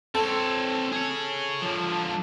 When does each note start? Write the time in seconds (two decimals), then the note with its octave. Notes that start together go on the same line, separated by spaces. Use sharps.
0.15 C4 A4 C#5
0.93 G#4 C#5
1.62 D3 F3